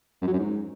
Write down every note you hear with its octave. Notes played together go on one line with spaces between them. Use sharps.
F#2
F#3
F#2
G#2